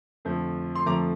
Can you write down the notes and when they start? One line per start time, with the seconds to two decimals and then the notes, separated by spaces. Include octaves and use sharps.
0.25 F2 D3 F3 A3
0.75 C6
0.86 F2 D3 F3 A3 A#5 D6